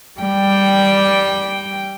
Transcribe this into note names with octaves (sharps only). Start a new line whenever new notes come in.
G3 G5